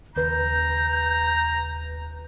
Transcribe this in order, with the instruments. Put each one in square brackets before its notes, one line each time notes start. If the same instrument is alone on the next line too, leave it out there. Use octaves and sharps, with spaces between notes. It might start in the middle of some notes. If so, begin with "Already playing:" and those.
[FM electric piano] D#2 C#3 B4 [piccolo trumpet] A#5 [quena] G6